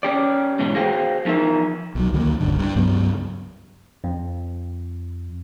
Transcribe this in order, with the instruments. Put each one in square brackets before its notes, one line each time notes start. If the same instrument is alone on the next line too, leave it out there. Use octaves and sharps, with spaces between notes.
[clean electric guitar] C#4 G4 D5
G#2 B2 E3 A3
F#4 G#4 C5 F5 G5
E2 F3 D#4 A#4 E5
[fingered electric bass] B1 F#3
D2 D#3 G#3 A#3
E1 C2 G2 D3
G2
C#2 G2 F#3 B3
[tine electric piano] F2